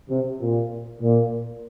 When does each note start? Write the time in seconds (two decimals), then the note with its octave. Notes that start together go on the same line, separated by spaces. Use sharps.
0.10 C3
0.40 A#2
1.01 A#2